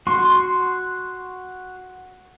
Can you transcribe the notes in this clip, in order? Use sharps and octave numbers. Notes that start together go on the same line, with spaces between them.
F#4 C6 C#6